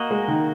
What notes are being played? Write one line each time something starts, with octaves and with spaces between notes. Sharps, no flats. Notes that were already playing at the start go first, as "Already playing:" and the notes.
Already playing: A#3 F#4 D#5
G#3
D#3